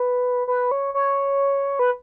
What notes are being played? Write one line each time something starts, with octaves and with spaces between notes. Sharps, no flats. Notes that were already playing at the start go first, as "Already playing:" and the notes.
Already playing: B4
B4
C#5
C#5
B4